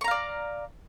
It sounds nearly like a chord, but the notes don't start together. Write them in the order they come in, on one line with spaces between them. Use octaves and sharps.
C#6 A#5 F5 D5